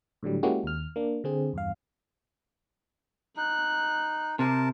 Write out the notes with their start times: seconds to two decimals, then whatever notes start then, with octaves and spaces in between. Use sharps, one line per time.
0.23 A2 D3 F#3 G3
0.43 G#3 A#3 C#4 E4 F#4 G4
0.63 D#2 F6
0.96 A#3 D4
1.24 D3 C4 G#4
1.53 E2 G2 F5
3.37 D#4 F#6
4.39 C3 A#4 A5